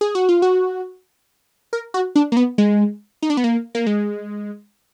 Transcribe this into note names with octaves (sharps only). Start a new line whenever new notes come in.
G#4
F#4
F4
F#4
A#4
F#4
D4
A#3
B3
G#3
D#4
D4
B3
A#3
A#3
G#3